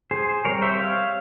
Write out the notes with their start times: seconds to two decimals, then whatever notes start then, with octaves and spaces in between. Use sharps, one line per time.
0.11 G#4 C5
0.45 G3 C4 A#4 C#5
0.62 C5 E5
0.79 C#5 F5